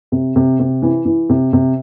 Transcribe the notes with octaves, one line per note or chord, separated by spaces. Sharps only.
C3
C3
C3
E3
E3
C3
C3